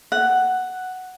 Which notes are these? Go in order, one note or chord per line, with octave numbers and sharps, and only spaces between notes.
F#5